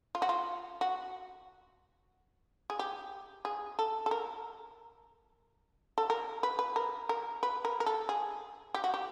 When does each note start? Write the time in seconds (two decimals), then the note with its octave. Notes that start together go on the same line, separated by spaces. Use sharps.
0.15 F4
0.22 F#4
0.29 F4
0.81 F#4
2.70 G#4
2.79 G4
3.45 G#4
3.79 A4
4.06 A4
4.11 A#4
5.98 A4
6.10 A#4
6.43 B4
6.59 B4
6.76 A#4
7.09 A#4
7.43 B4
7.65 A#4
7.80 A#4
7.86 A4
8.09 G#4
8.74 G4
8.84 F#4
8.94 G4